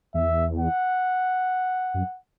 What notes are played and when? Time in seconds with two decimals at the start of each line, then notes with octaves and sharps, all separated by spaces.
0.14 E2 E5
0.60 F#5
1.94 F#2